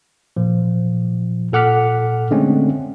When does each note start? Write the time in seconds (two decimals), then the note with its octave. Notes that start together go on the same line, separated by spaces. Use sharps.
0.37 A#2 F3
1.53 A#2 A4 F#5 D6 F6 B6
2.31 D3 G#3 A3 C4 C#4